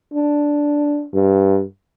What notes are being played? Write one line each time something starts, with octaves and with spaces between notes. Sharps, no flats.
D4
G2